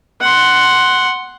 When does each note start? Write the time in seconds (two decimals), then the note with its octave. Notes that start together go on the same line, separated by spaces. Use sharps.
0.21 F#5 C6